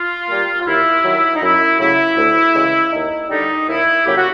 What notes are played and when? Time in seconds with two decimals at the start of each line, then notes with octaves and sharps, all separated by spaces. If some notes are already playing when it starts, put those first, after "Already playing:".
Already playing: F4
0.29 G3 A#3
0.60 F4
0.66 D#2 E4
1.04 D#3 F#3
1.35 D#4
1.42 F#2 E4
1.78 C#3 F#3 A3 E4
2.17 D2
2.54 C#3 E3 G#3
2.91 D#2 D#4
3.29 D3 G3 D#4
3.68 D#2 E4
4.05 C#3 F#3 A#3 G4
4.16 F#4